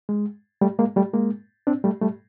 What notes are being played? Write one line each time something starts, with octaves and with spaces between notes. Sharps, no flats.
G#3
G3 A3
G#3 A#3
G3 A3
G#3 A#3
C4 D4
G3 A3
G3 A3